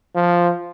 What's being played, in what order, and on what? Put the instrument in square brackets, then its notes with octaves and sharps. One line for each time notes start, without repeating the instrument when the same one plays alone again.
[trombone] F3